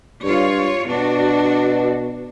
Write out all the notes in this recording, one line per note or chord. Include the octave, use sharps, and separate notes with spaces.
G2 F4 C#5
B2 D4 F#4